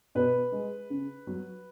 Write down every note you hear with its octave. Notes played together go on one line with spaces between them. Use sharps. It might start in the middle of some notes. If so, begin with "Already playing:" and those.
B2 B4
G#3
C#3
F#3